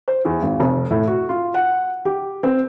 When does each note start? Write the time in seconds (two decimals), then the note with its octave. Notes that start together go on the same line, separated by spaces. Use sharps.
0.08 C5
0.25 E2
0.43 G#1
0.60 F1
0.90 A2
1.07 F#4
1.29 F4
1.54 F#5
2.05 G4
2.43 C4